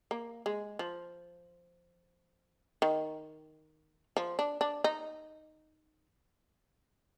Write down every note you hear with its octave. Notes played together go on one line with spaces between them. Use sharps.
A#3
G#3
F3
D#3
F3
D4
D4
D#4